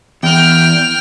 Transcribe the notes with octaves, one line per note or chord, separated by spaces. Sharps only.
E2 G5 F6